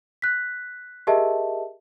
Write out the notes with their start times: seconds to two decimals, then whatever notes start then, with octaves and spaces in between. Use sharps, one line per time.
0.22 F#6 B6
1.07 G4 G#4 A#4 D#5 E5 A5